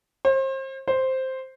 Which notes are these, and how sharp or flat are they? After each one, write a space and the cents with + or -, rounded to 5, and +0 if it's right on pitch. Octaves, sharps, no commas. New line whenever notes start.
C5 +35
C5 +0